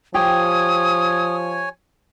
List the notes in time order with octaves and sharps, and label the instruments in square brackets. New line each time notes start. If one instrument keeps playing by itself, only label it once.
[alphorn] F3 [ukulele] G4 G5 [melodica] C#5 G#5 [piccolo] D#6